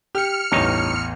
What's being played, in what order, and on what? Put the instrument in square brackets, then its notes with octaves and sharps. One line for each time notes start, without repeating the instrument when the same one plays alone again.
[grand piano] G4 [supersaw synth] F6 C#7
[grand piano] A1 E2 [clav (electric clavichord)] G2 D#4 C#5